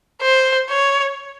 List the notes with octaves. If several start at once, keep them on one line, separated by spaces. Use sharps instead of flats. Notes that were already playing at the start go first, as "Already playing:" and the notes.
C5
C#5